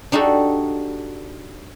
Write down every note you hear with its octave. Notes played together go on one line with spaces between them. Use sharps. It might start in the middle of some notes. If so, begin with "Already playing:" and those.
D4 D#4 F#4 G4 A4